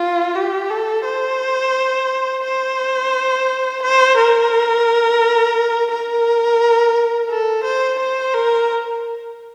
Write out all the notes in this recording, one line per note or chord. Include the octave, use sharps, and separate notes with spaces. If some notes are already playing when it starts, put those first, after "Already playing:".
Already playing: F4
G4
A4
C5
C5
C5
A#4
A#4
A4
C5
C5
A#4